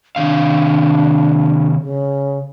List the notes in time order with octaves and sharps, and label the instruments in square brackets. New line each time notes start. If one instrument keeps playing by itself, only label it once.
[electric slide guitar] C3 D#3 F5 [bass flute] D4
[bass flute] C#3